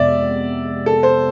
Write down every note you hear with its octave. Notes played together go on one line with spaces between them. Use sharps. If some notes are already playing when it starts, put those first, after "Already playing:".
Already playing: F2 C3 G#3 B3 D5 E5
A4
C5